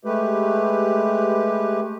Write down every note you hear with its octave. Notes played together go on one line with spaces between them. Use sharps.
G#3 A3 G4 B4